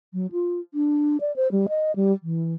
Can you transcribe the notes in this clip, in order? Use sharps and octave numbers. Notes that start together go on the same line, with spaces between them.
F#3
F4
D4
D5
C5
G3
D#5
G3
E3